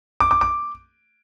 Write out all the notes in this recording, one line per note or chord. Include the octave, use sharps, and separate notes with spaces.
D6
D6
D6